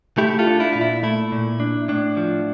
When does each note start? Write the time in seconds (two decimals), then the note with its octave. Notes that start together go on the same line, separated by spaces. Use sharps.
0.18 A3 E4 G4
0.39 F4 A4
0.47 D4
0.60 E4
0.73 A#2 F4
0.81 E4
1.03 A3 E4
1.32 A#2
1.60 D4
1.88 A2 D4
2.17 F3